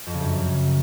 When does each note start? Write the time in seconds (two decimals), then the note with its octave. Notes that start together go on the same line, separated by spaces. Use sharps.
0.07 F2
0.14 C#3
0.21 F#2